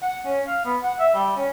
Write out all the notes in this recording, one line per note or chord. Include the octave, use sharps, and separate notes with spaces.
F#5
C#4
F5
B3
F#5
E5
G3
C#4